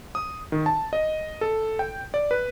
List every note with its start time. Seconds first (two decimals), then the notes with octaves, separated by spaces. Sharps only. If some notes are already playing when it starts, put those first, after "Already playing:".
0.15 D#6
0.52 D#3
0.66 A5
0.93 D#5
1.41 A4
1.79 G5
2.14 D5
2.31 B4